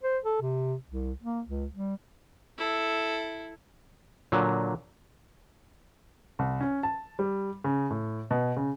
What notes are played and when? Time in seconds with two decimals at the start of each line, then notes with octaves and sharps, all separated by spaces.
0.03 C5
0.24 A4
0.41 C3
0.88 C2
1.23 A#3
1.46 C#2
1.74 G3
2.58 E4 A4
4.32 A#2 D3 F#3
6.39 C2
6.61 C#4
6.83 A5
7.19 G3
7.64 C#3
7.90 A2
8.31 B2
8.57 C#3